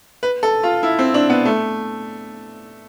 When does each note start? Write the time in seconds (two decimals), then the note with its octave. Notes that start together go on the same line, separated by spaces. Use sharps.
0.23 B4
0.43 A4
0.63 F4
0.83 E4
0.99 C4
1.14 D4
1.30 B3
1.45 A3